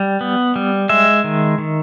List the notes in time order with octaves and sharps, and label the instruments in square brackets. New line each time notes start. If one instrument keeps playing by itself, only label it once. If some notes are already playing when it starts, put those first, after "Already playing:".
Already playing: [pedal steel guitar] G3
B3
G3
G#3 E5
D#3
D#3